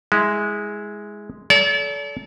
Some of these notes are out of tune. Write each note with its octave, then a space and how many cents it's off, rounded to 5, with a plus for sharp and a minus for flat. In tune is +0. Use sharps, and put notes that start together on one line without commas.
G#3 +0 E4 -20
A4 -25 D5 -45 A#5 +0